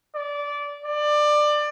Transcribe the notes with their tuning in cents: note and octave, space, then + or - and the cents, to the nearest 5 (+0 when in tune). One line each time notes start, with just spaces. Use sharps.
D5 -20
D5 +20